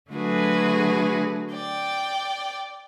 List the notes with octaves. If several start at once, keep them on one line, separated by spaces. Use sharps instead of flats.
D3 F#3 A3 F#4 G#4 B4
D5 G5